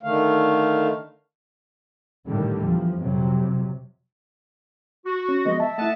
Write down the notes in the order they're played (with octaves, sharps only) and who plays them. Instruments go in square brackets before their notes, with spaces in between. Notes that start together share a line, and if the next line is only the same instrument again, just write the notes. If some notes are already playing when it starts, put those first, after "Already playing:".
[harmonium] D3 D#3 A3 F5
[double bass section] A2 D3 D#3 G3
E2 F3
F2 C3 F#3
[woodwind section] F#4
[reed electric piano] C#4
[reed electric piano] F3 G#3 B3 [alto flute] D#5
[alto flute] E5 [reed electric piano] A5
[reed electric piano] A3 E4 [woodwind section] D#5 F#5 A5